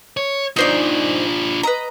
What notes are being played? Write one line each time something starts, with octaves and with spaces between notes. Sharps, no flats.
C#5
D4 D#4 F4 C5 D5
B4 D#5 A#5